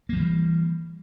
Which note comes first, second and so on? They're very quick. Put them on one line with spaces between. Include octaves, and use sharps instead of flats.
A#3 F3 E3 G3